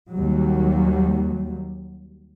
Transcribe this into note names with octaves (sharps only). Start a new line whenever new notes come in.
D#2 F#3 G3